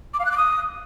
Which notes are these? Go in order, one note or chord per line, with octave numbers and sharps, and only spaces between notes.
D6
F5
F#6
D6
D#6